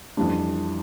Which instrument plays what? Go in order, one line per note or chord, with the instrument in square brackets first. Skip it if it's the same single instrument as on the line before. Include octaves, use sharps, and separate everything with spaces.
[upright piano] F2 E3 G3 D4